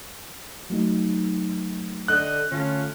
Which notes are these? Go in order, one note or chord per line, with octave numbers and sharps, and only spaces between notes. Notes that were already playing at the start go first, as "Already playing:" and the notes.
F#3 A3 D#4
D3 D#5 F#6
D3 A3 C#4 F4